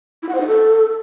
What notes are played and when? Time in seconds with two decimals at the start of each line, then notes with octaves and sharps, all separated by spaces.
0.23 E4
0.29 F#5
0.35 C5
0.41 D#4
0.47 A4